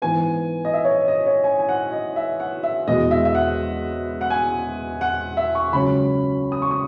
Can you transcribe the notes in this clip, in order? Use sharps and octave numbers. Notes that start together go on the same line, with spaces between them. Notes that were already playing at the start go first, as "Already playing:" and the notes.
G#2 E3 B3 G#5
D#5
E5
C#5
D#5
D#5
C#5
G#5
G#5
F#5
D#5
E5
F#5
E5
E1 E2 B2 G#3 D#5
E5
E5
F#5
F#5
G#5
F#5
E5
C#6
C#2 C#3 F#3 C#4 B5
D#6
C#6
D#6